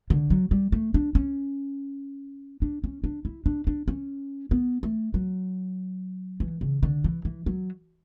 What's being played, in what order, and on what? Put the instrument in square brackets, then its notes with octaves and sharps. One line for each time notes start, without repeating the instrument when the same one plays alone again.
[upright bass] D3
F#3
G3
A3
D4
C#4
D4
C#4
D4
E4
D4
D4
C#4
B3
A3
F#3
E3
C#3
D3
E3
E3
F#3